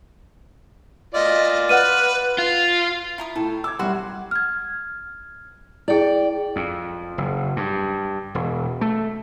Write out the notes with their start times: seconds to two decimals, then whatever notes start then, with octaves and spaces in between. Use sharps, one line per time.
1.14 F4 D5 D#5
1.69 B4 F#5 F6 D#7
2.38 F4
3.18 E4 A#5 D#6
3.36 A2 A4
3.64 D6 E6 G#6
3.79 F#2 G3 F#4 C5 F#5
4.31 F6 G#6
5.88 E4 G#4 D5 G5
6.56 F2
7.18 F#1
7.56 G2
8.35 E1
8.81 A3